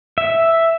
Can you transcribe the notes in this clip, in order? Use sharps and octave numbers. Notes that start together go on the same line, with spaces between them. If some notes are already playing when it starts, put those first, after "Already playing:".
E5